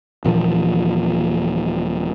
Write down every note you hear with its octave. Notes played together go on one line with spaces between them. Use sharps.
D#1 A#2 E3 F3